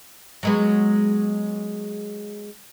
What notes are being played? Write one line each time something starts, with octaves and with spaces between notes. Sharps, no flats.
F#3 G#3 B3